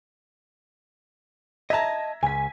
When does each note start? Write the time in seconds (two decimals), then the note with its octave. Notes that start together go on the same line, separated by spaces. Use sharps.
1.70 D#5 E5 A5 A#5 G#6 A#6
2.23 C#2 G#5 B6